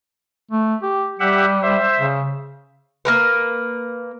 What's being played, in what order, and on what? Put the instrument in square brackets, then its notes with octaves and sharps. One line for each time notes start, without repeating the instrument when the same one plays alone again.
[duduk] A3
G4
[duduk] G3 [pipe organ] G4 E5 F#5
[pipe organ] C5 E5
[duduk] C#3
[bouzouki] A#3 A#4 B4